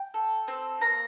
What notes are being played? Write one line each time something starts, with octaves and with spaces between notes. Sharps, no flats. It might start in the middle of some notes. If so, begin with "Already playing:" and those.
Already playing: G5
A4
C4
A#3 A#5